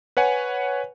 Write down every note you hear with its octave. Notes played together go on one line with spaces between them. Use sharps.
B4 C#5 F#5 G#5